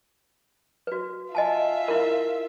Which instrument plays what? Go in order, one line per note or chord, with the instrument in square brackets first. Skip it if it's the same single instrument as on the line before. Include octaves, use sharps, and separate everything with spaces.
[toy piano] F#4 B4
[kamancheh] F4 E5 [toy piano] D#5 G#5 A5
[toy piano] E4 A#4